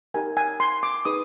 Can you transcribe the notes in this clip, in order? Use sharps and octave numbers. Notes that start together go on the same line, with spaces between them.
D#4 G4 A#4 G#5
G#5
C6
D6
D#4 G#4 B4 D#6